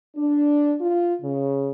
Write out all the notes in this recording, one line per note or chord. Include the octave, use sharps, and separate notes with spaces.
D4
F4
C#3